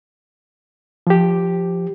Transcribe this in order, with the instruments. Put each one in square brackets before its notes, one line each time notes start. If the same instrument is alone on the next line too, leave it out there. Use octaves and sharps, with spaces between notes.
[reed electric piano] F3 G4